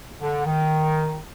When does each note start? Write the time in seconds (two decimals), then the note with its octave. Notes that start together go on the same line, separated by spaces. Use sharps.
0.21 D3
0.46 D#3